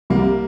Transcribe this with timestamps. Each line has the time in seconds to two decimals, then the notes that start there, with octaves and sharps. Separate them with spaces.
0.10 C2 G3 A#3